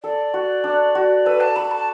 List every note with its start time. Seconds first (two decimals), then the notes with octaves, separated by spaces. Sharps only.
0.03 A4 D5
0.34 F#4
0.64 D4
0.95 F#4
1.25 A4 B4
1.40 A5
1.56 A4 B5
1.71 A5